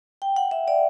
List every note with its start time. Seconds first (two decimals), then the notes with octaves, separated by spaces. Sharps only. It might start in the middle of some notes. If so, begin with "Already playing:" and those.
0.22 G5
0.36 F#5
0.51 E5
0.68 D5